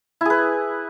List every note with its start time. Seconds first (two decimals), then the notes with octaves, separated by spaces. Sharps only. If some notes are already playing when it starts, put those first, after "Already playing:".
0.21 E4
0.25 G#4
0.30 B4